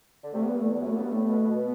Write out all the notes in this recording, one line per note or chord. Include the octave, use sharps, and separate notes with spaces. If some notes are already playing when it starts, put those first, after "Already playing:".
D3
C3 A3
G2 B3
A3
E2
B3
F#2 A3
G2 B3
A2 A3
B2
B2
B3